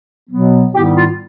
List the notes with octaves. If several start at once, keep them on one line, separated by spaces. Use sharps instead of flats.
B2 F#3 B3
G#2 D#3 G3 B3 E4 G4
F4